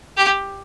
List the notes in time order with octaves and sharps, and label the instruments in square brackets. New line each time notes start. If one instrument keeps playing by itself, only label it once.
[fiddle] G4